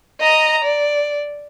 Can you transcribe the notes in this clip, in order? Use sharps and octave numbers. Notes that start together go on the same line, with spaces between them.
D#5 A#5
D5